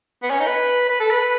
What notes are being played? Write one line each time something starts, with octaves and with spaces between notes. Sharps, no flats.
B3
C#4
D#4
B4
B4
A4
B4